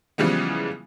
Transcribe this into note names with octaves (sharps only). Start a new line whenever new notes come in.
C#3 E3 F3 G3 G#3 B3